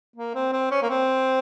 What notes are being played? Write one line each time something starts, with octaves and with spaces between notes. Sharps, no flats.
A#3
C4
C4
C#4
A#3
C4